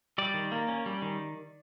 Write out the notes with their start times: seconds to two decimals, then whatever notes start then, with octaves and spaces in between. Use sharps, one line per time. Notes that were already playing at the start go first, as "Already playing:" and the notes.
0.18 G3 D5
0.34 D#3
0.52 A#3
0.69 C#4
0.86 G3
1.02 D#3